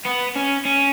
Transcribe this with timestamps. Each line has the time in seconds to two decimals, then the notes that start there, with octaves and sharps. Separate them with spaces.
0.06 B3
0.36 C#4
0.65 C#4